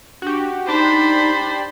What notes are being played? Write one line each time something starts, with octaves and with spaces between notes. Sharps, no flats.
D4 F#4 G4
D4 D#4 G4 C5 A5 B5